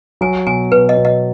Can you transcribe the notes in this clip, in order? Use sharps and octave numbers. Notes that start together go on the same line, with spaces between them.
F#3 G#5
B2 G#5
B2 B4
D#5
B2
D#5